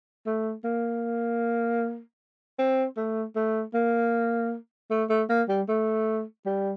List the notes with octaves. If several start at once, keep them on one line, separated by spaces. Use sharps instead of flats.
A3
A#3
C4
A3
A3
A#3
A3
A3
A#3
G3
A3
G3